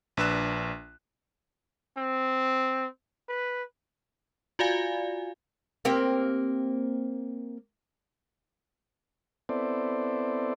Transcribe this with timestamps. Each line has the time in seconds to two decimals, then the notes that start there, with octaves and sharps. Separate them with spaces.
0.17 A#1 D4 B4 E6 F#6 E7
1.97 C4
3.29 B4
4.59 F4 F#4 D5 F5 G#5
5.85 A#3 C4 G4
9.49 B3 C4 E4 A4 C5 D5